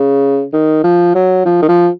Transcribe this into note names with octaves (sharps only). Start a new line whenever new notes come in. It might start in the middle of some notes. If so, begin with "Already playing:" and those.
Already playing: C#3
D#3
F3
F#3
F3
D#3
F3